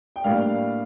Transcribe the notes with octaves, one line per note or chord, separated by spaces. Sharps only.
G5
A2 G3 A#3 D4 F5